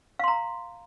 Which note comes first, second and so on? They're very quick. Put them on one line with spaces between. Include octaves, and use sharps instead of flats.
F5 C6 A#5